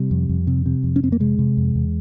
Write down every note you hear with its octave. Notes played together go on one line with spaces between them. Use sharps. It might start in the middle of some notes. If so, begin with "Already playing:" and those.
Already playing: C3 G3
F2
F2
C3
C3
F2
C#4
F2 C4
A#3
C3 G#3
C3
F2
E2